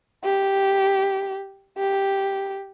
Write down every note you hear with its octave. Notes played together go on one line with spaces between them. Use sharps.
G4
G4